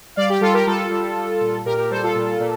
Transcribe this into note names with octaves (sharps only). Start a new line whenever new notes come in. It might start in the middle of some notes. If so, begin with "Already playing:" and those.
G3 D5 F5
G4
G3 F4 A4
G4 A#4
G3 F4 A4
G3
G3
A#2
A#2 G4 A#4
G4 A#4
G3 A4 C5
F4 A4
A#2
A#2